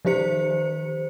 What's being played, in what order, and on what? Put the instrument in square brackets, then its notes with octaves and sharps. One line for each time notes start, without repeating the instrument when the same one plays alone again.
[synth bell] D#3 F3 G4 C5 C#7